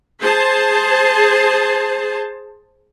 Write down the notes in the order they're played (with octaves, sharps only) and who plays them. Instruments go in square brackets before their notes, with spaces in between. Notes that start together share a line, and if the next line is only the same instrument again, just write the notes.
[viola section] G#4 C5 A5